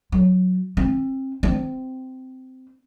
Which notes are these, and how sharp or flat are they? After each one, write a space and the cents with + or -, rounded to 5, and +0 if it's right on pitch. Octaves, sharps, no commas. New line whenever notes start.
F#3 -10
C4 +30
C4 -15